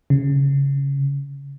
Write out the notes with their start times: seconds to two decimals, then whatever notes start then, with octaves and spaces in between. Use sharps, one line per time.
0.10 C#3